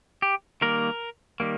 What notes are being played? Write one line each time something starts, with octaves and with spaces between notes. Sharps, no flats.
G4
D#3 G3 A#3 A#4
D#3 G3 A#3